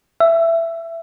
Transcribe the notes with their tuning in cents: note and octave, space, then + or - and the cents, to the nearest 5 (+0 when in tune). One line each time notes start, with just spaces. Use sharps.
E5 +15